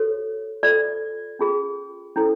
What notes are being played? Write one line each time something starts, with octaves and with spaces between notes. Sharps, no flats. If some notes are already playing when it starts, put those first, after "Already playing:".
Already playing: F#4 A4 C5 C#5
F4 A4 C5 D5
C#4 F4 G#4
C#4 E4 A4 C5